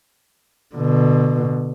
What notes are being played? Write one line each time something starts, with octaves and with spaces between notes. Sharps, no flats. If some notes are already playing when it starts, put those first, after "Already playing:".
B2 D3